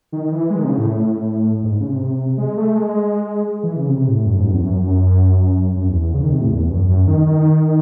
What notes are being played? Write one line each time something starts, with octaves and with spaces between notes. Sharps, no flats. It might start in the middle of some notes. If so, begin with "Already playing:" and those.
D#3
E3
G#3
D#3
C3
C#3
A2
G#2
C#3
C3
G#3
A3
G#3
E3
C#3
C3
A2
F#2
G#2
F#2
E2
F#2
F#2
F#2
E2
E2
C#3
D#3
C3
A2
E2
F#2
F#2
D#3
D#3